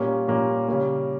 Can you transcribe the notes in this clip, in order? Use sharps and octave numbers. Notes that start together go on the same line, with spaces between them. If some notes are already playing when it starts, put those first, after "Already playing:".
Already playing: A#2 G3 A#3 C#4
A#2 G3 A#3 C#4
C#3 G3 A#3 C#4